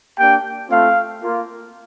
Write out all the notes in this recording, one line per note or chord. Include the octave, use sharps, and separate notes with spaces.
A#3 D4 G4 G5
A3 C4 F4 F5
A#3 F4